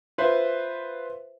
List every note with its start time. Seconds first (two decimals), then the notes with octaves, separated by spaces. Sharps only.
0.18 F4 B4 C5 E5